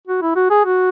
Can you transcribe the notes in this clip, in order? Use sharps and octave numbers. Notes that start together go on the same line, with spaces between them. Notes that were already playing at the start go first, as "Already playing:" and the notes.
F#4
E4
F#4
G#4
F#4